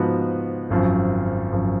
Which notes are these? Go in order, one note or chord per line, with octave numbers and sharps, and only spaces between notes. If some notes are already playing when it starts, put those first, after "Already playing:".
Already playing: G#2 F3 B3 F#4
G#1 F#2 F3
G#1 F#2 F3